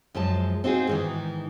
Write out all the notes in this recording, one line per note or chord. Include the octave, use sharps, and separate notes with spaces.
F#2 F3 G#3 A5
C4 D#4 F4 F#4 G#4
G#2 D#3 E3